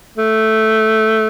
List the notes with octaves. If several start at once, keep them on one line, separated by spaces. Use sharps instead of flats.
A3